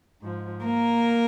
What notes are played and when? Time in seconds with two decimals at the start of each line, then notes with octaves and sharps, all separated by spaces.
0.22 G#2 F3
0.65 A#3 A#4